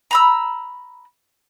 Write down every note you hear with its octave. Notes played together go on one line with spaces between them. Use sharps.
A#5 B5 E6